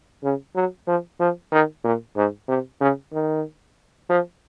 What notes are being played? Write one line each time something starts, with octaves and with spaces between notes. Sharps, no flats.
C#3
F#3
F3
F3
D#3
A#2
G#2
C3
C#3
D#3
F3